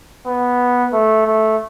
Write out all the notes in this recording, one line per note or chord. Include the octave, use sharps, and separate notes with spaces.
B3
A3
A3